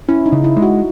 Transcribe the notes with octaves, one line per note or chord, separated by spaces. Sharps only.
C#4 E4
D#4
C#3
E4
G#3
F#4